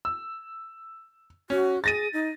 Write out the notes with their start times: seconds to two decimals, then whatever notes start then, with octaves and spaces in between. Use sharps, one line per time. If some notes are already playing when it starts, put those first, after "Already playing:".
0.05 E6
1.50 C#4 F#4
1.84 G#4 A6 A#6 D#7
2.13 D#4